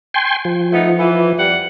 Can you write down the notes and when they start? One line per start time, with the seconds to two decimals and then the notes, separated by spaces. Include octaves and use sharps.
0.14 G5 G#5 C6
0.45 F3
0.73 A3 B3 D#4
0.98 E3
1.38 F2 G3 F#5